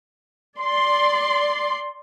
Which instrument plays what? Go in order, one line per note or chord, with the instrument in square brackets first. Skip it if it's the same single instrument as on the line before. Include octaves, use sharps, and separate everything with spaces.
[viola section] D5 C6